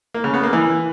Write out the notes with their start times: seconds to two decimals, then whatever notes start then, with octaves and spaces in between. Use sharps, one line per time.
0.14 A#3
0.24 C#3
0.34 B3
0.43 A#3
0.53 E3